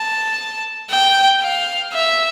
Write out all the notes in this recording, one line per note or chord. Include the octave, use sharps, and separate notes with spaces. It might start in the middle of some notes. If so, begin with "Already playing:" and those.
Already playing: A5
G5
F5
E5